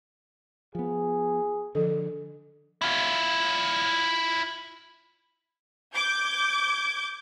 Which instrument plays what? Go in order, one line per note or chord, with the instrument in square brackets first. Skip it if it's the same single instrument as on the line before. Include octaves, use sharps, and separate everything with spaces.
[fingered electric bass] F3 B3 [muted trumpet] G#4
[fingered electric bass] D3 [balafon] F3 A4
[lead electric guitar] E4 F4
[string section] D6 G6 G#6